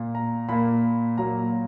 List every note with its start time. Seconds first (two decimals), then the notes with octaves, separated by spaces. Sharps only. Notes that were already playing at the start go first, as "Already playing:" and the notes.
Already playing: A#2 A#3
0.15 A#5
0.49 A#2 A#3 B5
1.18 A#2 F#3 A#3 A#5